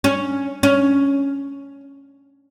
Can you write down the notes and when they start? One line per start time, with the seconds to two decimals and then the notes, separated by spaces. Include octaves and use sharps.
0.04 C#4
0.63 C#4